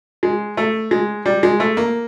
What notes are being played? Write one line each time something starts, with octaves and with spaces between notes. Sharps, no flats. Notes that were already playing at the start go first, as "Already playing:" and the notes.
G#3
A3
G#3
G3
G#3
A3
A#3